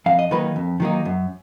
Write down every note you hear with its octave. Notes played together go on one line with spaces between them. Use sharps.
F2 F5
D#5
D#3 F#3 A#3 D#4 B4
F2
D#3 F#3 A#3 D#4
F#2